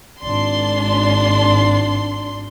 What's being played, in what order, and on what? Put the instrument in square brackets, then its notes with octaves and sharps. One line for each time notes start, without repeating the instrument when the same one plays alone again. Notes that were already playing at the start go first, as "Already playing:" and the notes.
[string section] G#1 D4 C6